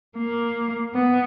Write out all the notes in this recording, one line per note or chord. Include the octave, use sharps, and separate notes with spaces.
A#3
B3